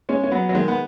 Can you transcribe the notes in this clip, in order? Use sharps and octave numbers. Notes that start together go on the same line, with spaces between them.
G#3 C#4
C#4
F#3 B3
F#3
D#3 G#3
B3